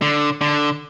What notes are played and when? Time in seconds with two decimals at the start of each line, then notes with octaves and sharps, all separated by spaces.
0.02 D3
0.41 D3